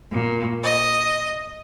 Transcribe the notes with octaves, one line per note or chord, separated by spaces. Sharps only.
A#2
D#5